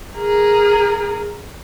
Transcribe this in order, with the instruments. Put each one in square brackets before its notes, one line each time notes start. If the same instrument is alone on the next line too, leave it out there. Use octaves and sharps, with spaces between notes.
[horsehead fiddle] G#4 A#4